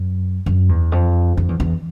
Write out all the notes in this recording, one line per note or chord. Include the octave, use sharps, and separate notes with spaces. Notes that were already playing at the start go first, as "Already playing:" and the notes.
Already playing: F#2
F#2
E2
F2
F2
E2
E2